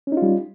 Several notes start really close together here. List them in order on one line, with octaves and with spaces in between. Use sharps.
C#4 D#4 F4 G3